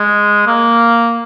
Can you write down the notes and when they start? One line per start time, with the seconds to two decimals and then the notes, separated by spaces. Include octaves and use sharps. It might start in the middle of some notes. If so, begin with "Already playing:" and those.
Already playing: G#3
0.47 A#3